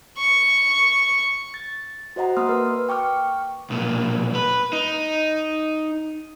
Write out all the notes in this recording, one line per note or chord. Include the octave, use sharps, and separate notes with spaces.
C#6
A6
F#4 C5 D#5 F#5 A#5
A#3 C6 D#6 F6
A#4 B4
G5 C#6 D6 F6
B1 A#2
B4
D#4